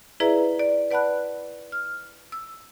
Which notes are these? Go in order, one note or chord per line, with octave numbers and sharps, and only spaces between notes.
E4 G#4 B4 D5 E5 A#5
D5
B4 D5 F#5 A5 B5 F#6
F6
E6